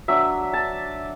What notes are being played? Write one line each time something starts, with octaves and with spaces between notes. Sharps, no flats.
F#3 D4 E5
A5